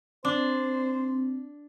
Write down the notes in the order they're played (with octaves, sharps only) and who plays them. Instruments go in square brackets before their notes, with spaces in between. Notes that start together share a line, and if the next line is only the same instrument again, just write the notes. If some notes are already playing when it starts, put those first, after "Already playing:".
[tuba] C4 [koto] D4 [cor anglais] C5